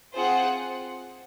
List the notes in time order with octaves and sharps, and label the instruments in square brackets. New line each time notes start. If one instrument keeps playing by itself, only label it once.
[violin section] C4 F4 G#4 C5 F#5